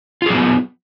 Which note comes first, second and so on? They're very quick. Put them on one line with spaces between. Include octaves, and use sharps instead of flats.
F4 G#4 F#3 B3